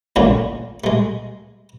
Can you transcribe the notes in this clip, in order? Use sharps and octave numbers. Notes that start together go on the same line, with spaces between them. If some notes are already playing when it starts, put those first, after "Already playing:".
E2 A#2 C#3 G#3 A3
G#3 A3